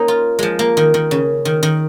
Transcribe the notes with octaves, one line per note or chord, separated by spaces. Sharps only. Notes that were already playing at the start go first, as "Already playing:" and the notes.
Already playing: A#3 C#4 D#4
F4
F3 G#3
A#3
D#3
D#3
C#3
D#3
D#3